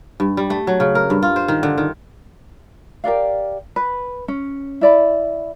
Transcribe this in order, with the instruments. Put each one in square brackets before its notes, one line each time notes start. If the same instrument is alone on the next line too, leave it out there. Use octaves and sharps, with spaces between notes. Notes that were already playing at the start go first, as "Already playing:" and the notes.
[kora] G2
G3
A3
F#3
C#3
A#4
G2
F4
C5
D#3
D3
D#3
[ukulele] G4 A#4 D5 F5
B4
C#4
E4 D5 B5